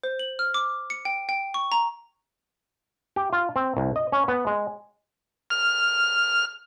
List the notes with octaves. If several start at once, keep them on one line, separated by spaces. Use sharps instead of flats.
C5
F#7
F6
D6
C#7
G5
G5
C#6
A#5
G4
F4
C4
C2
D#5
C#4
B3
G#3
F6